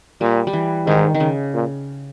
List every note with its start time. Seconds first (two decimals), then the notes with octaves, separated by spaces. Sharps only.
0.21 A#2 G3
0.47 G3
0.53 E3
0.87 G#2 D#3
1.14 D#3
1.20 C#3
1.54 A#2